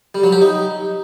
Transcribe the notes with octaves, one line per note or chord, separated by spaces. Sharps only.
G3
F#3
G4
D#4